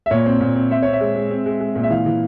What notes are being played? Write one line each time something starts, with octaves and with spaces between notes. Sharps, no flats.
E5
A#2 C#5
C4
A#2
C4
C4 E5
C4 C#5
E5
G#3
G#3
C4
G#3
G#3
A#2
E5
E3 F5
E3